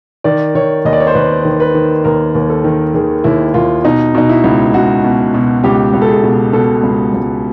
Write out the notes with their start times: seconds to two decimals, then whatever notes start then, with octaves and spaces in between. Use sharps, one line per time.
0.24 D#3 D5
0.55 D#3 C#5
0.85 D#2 D#5
0.93 D5
1.00 C#5
1.07 C5
1.15 D#2 B4
1.45 D#3
1.60 B4
1.74 D#3
2.04 D#2 A#4
2.35 D#2
2.50 A4
2.64 D#3
2.94 D#3 G#4
3.24 D#2 E4
3.54 D#2 F4
3.84 B2 D#4
4.14 B2 D#4
4.29 E4
4.44 C#2
4.74 C#2 F#4
5.04 B2
5.34 B2
5.64 C#2 G4
5.94 C#2
6.02 A4
6.09 G#4
6.24 B2
6.53 B2 A4
6.83 C#2
7.14 C#2